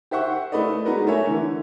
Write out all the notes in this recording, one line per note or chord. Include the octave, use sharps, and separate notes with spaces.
G4 C5 E5 F#5 C#6
A3 E4 B4 D5 D#5
G#3 B3 D#4 F#4 A#4 B4
A3 A#4 C#5 E5 G#5
D3 E3